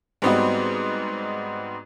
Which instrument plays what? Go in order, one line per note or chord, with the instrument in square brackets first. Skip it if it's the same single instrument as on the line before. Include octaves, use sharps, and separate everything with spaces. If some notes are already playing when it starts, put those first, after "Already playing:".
[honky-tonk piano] G#2 G3 B3 C4 D#4 F#4